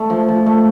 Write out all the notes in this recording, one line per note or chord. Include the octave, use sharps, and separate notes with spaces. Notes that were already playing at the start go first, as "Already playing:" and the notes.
Already playing: A3
F3
F3
A3